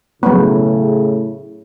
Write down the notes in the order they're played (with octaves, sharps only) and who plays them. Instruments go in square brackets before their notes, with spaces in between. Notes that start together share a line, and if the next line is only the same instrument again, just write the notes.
[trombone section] A2 C#3 [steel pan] F#3 B3